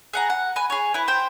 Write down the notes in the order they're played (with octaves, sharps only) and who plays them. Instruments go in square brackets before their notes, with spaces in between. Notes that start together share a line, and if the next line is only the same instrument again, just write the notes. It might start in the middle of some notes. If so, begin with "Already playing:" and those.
[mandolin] G#4 F#5 A#5
F#5
B4 G#5
G#4 C#5
E4 B4
C5 G5